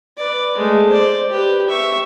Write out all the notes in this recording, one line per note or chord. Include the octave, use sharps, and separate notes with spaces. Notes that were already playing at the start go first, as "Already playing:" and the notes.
B4 D5
G#3 A3
C5 D5
G4 B4
E5 C#6